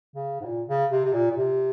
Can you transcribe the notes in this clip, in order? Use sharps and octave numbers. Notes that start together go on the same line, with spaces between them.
C#3
G#2
A#2
C#3
C3
C3
A#2
A#2
C3